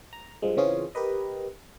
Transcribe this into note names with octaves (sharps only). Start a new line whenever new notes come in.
A#5
G2 F3 G#3
C#3 E3 C4 C#4 F4 G#4
G4 A#4 B4 D#5